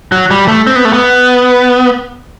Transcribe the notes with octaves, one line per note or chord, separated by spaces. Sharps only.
F#3
G3
A3
C4
B3
A3
B3